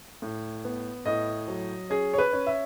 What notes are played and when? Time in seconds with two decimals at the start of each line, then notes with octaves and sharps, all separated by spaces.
0.22 A2
0.65 B3
1.05 A2 D#5
1.48 F#3
1.90 C#4 G#4
2.14 C#5
2.18 B4
2.33 C#4
2.47 E5